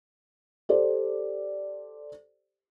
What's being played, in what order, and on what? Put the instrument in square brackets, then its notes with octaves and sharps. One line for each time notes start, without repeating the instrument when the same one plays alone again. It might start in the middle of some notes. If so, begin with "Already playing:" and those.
[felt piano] G4 A4 C5 D5